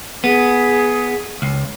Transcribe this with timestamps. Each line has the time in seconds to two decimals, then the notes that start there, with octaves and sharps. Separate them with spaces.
0.24 B3 G#4
1.42 C#2